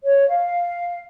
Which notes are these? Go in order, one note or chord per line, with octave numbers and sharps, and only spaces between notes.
C#5
F5